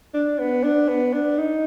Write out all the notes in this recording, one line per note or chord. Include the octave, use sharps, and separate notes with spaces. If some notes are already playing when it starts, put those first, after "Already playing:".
D4
B3
D4
B3
D4
D#4